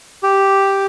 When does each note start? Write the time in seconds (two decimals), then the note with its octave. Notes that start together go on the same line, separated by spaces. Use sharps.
0.23 G4